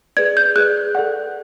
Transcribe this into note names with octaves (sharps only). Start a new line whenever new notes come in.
G#4 B4 D5 G#6
G6
G#4 B4 D5 F#6
A4 D5 F#5